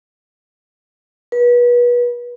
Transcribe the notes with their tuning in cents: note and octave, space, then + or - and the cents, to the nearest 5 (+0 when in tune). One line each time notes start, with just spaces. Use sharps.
B4 -30